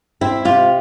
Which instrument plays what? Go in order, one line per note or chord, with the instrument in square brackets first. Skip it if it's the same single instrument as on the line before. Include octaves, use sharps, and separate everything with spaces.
[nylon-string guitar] C4 E4
C3 F4